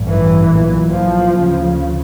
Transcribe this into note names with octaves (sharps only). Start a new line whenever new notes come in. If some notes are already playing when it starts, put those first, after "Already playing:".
Already playing: A1 G2
E3
B1 A#2
F3
D2 C#3